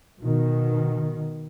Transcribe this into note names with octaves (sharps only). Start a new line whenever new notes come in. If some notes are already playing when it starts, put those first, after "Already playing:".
B2 D#3